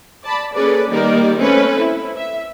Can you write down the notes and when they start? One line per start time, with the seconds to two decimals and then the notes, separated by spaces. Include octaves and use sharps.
0.24 D5 A5 B5
0.54 A#3 C#4 G#4 A4 B4 D5
0.89 D#3 G3 A#3 D#4 A#4 D5
1.40 A3 C4 C#4 A4 B4 C#5
1.79 E4
2.16 E5